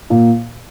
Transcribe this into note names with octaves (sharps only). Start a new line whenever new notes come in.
A#2